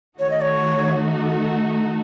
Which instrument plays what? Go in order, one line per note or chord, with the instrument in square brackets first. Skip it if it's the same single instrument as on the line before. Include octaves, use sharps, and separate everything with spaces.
[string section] D#3 A3 D#4 F#4 A4 [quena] C#5
[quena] D#5
C#5